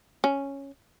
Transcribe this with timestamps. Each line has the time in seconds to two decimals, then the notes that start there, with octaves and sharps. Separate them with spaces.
0.24 C#4